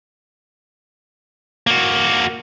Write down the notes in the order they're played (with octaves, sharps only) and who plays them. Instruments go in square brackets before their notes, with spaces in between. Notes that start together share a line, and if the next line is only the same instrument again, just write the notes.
[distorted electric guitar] A#3 F#4